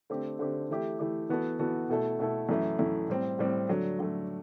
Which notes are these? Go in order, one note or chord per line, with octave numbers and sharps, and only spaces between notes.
D3 A3 C4 G4
D3 A3 C4 G4
E3 A3 E4 G4
E3 A3 E4 G4
E3 B3 F#4 A4
E3 B3 F#4 A4
B2 A3 E4 A4
B2 A3 E4 A4
F#2 E3 A3 E4
F#2 E3 A3 E4
A2 G3 C4
A2 G3 C4
D3 F#3 A3
D3 F#3 A3